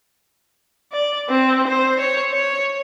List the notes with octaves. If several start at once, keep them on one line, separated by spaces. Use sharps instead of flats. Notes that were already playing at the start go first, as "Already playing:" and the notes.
D5
C4
C5
C#5
C#5